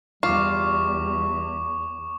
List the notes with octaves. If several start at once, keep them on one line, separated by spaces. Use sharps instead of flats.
E2 G3 F4 C#6 D6